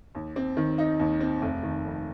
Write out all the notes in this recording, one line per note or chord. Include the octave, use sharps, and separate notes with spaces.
D#2
C4
D#3
D#4
D#2
C4
F1
D#3
F2